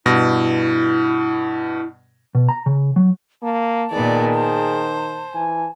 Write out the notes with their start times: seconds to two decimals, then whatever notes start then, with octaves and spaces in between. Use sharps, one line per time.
0.06 G2 B2 E4 A#6
2.35 B2
2.49 A#5
2.66 C#3
2.96 F#3
3.43 A#3 A5
3.93 A#2 D#3 B3 G#4 D5
4.35 C5
5.34 E3 G#5